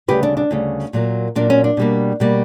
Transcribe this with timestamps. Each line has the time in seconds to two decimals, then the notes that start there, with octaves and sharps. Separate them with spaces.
0.08 D2 C#3 G3 G4 B4
0.23 D4
0.37 D4
0.51 D2 C#3 G3
0.93 A#2 F#3 A#3
1.36 A#2 F#3 A#3 D4
1.50 C#4
1.64 D4
1.77 B2 G3 A#3
2.20 B2 G3 A#3